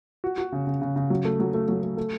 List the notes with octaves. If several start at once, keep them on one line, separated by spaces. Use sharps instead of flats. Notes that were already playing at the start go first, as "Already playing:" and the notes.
F#4
F#4
C#3
C#3
C#3
C#3
F#3
A3
F#3
A3
F#3
A3
A3